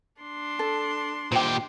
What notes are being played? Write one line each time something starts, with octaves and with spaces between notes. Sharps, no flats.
D4 C6
A4
A#2 G4 C5 G5